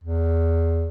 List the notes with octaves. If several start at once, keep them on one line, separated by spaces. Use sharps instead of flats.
E2